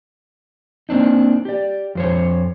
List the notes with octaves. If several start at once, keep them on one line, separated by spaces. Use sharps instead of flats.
A#3 C4 D4 D#4
G4 D5
F2 C5 C#5